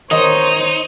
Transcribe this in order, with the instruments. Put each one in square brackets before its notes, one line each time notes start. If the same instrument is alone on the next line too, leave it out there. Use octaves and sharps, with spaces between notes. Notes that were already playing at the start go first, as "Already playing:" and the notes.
[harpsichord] D#3 [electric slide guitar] D#4 [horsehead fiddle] C5 C#5 [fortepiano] D#5